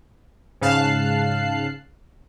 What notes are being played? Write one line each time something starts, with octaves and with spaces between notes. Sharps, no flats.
G#2 C#3 F5 A5 F#6 C7